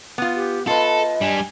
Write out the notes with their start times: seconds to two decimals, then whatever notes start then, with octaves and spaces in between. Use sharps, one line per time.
0.18 B3 F4
0.35 G4
0.67 F4 A4 B4 D#5 A5
1.21 G3 D4 G#5